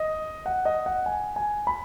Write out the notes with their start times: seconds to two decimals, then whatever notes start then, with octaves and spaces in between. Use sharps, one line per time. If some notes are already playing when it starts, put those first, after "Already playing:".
Already playing: D#5
0.46 F#5
0.65 D#5
0.86 F#5
1.06 G#5
1.36 G#5
1.67 B5